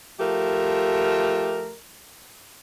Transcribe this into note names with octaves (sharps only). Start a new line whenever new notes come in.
F3 A3 G4 A#4